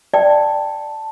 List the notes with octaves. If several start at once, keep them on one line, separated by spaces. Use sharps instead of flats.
D5 G5 A5